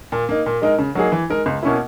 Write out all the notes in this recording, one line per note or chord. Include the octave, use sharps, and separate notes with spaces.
A#2
A#3 D#4
A#2
G#3 D#4 A#4
C#3
F#3 A#3 D#4 G#4
E3
G#3 D#4 A#4
C#2
B2 A#3 C#4 E4